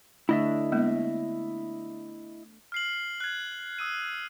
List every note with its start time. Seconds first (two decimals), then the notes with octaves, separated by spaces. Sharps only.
0.29 D3 A3 D4 E4 D#5 E5
0.72 G#3 A#3 B3
2.72 F6 C7 F#7
3.20 F#6 G#6
3.79 D#6 E6 D#7